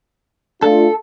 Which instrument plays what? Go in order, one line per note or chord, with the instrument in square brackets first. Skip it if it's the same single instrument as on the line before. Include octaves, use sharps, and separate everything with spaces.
[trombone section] A3 D4 F4 [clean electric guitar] A4